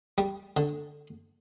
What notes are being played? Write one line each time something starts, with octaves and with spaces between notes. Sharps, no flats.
G3
D3